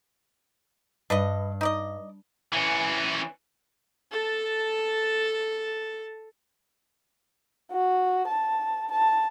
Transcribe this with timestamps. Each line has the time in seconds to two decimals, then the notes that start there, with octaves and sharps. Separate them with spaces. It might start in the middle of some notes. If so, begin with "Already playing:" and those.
1.10 G2 D4 B4 D#5
1.61 D#4 D5 D#5
2.53 E3 C#4
4.12 A4 A5
7.71 F#4
8.28 A5
8.91 A5